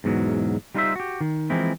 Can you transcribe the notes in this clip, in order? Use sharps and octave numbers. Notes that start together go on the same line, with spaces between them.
E2 G#2 B2 F#3
G3 D#4 F4 A4 C5 E5
F#4 G4
D#3
E3 F3 G#3 A#3 C4 E4